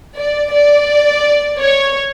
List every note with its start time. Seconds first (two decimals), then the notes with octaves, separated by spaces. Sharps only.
0.17 D5
0.53 D5
1.60 C#5